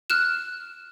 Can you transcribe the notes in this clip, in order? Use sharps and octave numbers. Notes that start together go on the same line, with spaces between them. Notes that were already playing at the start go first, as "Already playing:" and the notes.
F6 F#6 E7